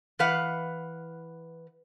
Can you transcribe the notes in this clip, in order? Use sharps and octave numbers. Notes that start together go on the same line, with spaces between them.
E3 B4 F5 F#5